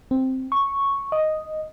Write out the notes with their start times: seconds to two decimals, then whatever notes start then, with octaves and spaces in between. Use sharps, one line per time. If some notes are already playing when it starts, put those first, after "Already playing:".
0.11 C4
0.52 C#6
1.12 D#5